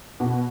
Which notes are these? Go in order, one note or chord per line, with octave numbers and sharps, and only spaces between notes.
B2